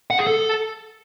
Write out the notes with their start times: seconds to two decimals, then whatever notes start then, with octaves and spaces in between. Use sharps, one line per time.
0.10 F#5
0.19 G#4
0.27 A4